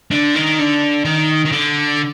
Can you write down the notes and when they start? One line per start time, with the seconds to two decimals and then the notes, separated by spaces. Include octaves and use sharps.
0.11 D3
0.35 D#3
0.59 D3
1.05 D#3
1.45 D#3
1.52 D3